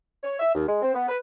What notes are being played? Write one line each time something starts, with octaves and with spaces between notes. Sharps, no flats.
C#5
E5
D#2
G#3
C4
B3
B4